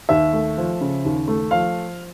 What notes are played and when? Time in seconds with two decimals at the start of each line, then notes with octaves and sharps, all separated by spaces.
0.09 D#2 E5
0.33 A3
0.57 F3
0.81 C#3
1.05 D#2
1.28 A3
1.51 F3 F5